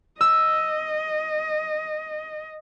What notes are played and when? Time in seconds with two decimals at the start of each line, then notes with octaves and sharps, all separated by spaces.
0.21 D#5 E6